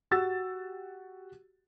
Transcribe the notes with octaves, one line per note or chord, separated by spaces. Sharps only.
F#4 G4 F#5 E6 A6